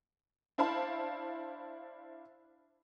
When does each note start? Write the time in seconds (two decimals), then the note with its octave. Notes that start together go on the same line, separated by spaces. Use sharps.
0.58 D4 E4 C5 F5 A5 B5